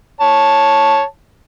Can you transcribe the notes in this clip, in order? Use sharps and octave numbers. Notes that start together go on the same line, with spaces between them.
C#5 A5